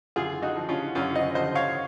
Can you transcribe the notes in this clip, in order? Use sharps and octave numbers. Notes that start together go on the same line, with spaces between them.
F#2 F4 G#4
D#4 F#4
F3
C#4 F4
F#2 C#4 F4
C5 D#5
F3 C5 D#5
C#5 F5